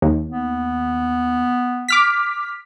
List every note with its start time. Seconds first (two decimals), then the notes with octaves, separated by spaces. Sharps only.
0.02 D#2
0.29 B3
1.88 D6 F6 B6